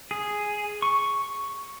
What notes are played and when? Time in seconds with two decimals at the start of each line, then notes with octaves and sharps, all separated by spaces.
0.11 G#4
0.82 C#6